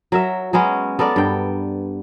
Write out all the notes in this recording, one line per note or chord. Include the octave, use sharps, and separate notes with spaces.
F#3 A#4 E5
F#3 G#3 B3 C#4
B3 A4 A#4 D5
G2 G5